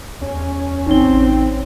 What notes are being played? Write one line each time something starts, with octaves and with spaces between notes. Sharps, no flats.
E2 C#4
A1 C4 D#4 C#5 G7